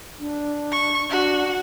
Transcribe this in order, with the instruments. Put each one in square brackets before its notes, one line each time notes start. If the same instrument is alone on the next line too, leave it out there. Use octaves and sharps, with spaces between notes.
[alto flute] D4
[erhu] C#6
[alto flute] D4 [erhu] F#4